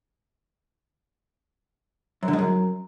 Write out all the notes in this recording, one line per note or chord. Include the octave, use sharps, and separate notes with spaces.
F#2
D3
G#2
F#2